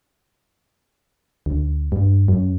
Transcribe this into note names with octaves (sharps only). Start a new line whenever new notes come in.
D2
G2
F#2